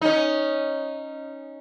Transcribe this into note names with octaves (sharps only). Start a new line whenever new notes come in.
C#4 D#4